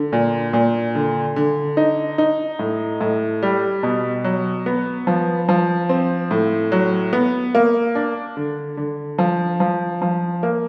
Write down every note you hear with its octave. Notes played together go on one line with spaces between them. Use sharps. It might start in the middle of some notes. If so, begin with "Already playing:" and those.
Already playing: D3
A#2
A#2
D3
D3
D#4
D#4
A2
A2
G3
B2
F#3
B3
F3
F3
C4
A2
F#3
B3
A#3
D4
D3
D3
F3
F3
F3
A#3